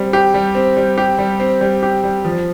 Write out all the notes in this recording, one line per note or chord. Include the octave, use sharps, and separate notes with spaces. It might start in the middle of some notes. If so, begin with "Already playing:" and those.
Already playing: G3 C4
G4
G3
C4
G3
G4
G3
C4
G3
G4
G3
F3